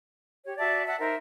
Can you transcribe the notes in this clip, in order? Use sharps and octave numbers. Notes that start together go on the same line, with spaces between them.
G4 C#5
F#4 D5 E5 A5
E5 F#5 A5
D#4 A#4 C5 E5